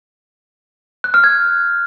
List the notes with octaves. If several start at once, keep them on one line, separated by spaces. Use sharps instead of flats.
F#6
F6
G#6